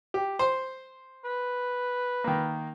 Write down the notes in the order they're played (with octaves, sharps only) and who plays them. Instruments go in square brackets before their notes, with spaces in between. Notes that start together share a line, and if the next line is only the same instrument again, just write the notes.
[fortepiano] G4
C5 C6
[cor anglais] B4
[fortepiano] D#3 A#3